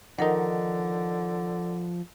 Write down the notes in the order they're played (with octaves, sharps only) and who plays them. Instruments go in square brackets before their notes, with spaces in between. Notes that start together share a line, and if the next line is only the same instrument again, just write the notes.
[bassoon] D3 [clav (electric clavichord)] D#3 D#4 [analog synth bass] F3 [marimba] A#4 F#5